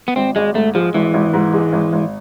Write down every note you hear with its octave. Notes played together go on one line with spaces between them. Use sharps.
B3
G#1 C4
G#1 G#3
G#2 A3
F3 G#3
G#1 E3
G#1
G#2
G#3
G#1
G#1